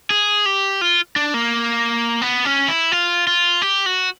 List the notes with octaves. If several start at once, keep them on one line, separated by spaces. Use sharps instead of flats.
G#4
G4
F4
D4
A#3
B3
C#4
E4
F4
F4
G4
F#4